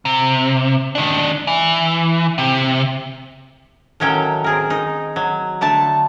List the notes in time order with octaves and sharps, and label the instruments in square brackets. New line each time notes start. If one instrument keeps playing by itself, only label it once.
[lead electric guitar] C3
D#3 D4
E3
C3
[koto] A2 D#3 F#3 C#4 G5
C4 G#4 A#4
D#4
F#3
D3 A3 A5